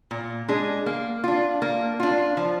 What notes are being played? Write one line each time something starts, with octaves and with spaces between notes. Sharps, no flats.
A#2
G#3 D4 G#4
A#3
D4 F4
A#3
D4 F4
F3